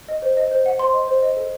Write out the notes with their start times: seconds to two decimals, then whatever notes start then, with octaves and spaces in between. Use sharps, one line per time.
0.08 D#5
0.22 C5
0.37 D#5
0.51 C5
0.66 F#5
0.79 C5 C6
0.93 D#5
1.08 C5
1.22 D#5
1.37 A4